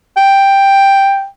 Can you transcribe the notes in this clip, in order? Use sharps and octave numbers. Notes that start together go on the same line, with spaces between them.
G5